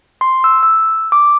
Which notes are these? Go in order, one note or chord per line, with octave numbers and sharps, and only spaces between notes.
C6
E6
E6
D6